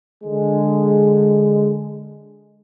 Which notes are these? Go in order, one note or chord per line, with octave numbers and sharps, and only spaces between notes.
D3 G#3